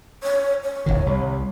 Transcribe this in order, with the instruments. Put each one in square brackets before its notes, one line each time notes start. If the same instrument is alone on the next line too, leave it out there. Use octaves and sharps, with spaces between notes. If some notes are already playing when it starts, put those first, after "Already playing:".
[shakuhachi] C#5
C#5
[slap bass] D1 G#1 D#3
C2